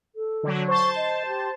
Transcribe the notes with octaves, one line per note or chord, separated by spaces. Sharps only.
A4
D3 F#3
C5 A5 C#6
D#5
G4